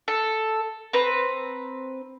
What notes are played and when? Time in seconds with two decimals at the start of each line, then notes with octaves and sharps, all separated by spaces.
0.08 A4
0.93 C4 B4 A#5